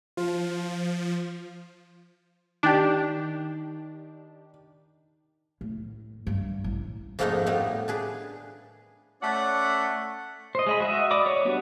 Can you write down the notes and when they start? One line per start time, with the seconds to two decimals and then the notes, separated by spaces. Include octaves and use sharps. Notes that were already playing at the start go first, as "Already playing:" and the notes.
0.17 F3 F4
2.63 D#3 D4 G4
5.61 A2
6.27 G2
6.64 A1
7.19 F2 G#2 A3 A#3 D4 D#4
7.46 A2 G3 B3
7.88 D4 G#4 B4
9.23 A3 C#4 D5 F#5
10.55 C5 D#5
10.67 G#3 D#5 B5
10.80 F#4 D#5 E5
11.11 D5 B5 D6 D#6
11.26 C#5
11.45 G3 B3 D4 F#4